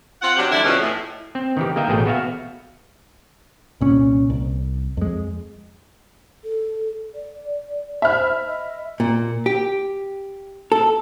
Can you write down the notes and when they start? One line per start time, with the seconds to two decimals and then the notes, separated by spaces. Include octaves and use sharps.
0.22 C4 F4 F#5
0.37 C3 F#3 D4 G4
0.50 E2 D3 G3 D4 E4
0.63 F2 G#2 B2 C#4
0.81 A2
1.35 C4
1.57 D#3 E3 G4
1.76 A#3 A#4 D#5 E5 G5
1.88 A1 B2 A3 G#4 G5
2.06 B3 F#4 E5 F5
3.81 C2 A#2 C#4
4.30 C2
4.97 F2 G#3
6.44 A4
7.15 D5
8.02 C5 E5 B5 F6
8.47 D#5
9.00 A#2
9.46 G4
10.72 A4